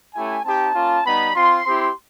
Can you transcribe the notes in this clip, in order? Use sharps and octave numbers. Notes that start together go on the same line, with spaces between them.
A3 C#4 E4 G4 G#5
C4 D#4 G4 A5
A#3 C#4 F4
G3 B3 D#4 B5
C4 F4 C6
C4 E4 G4